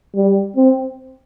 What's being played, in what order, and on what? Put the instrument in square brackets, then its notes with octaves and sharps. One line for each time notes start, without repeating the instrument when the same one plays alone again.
[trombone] G3
C4